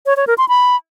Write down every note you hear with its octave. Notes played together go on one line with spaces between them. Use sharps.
C#5
C#5
A#4
C6
B5